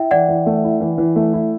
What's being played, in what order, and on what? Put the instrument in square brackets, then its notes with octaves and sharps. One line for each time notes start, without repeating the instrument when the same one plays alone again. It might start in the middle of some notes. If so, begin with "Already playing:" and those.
Already playing: [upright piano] E4 [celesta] E5 G5
[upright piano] E3 [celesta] D5 F#5
[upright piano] E3
A3
E4
E3
E3
A3
E4